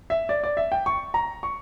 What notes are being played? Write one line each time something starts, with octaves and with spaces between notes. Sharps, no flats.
E5
D5
D5
E5
G5
C#6
A#5
C#6